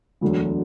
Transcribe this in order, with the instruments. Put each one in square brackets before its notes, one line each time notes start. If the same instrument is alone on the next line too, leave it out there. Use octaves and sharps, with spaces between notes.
[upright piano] E1 D2 D3 F#3